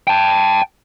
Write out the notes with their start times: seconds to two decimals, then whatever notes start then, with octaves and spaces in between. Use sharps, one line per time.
0.08 G5 A5